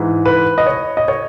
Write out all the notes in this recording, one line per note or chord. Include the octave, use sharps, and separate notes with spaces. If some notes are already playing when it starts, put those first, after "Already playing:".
Already playing: G#2 E3
B4
D#5
C#5
D#5
C#5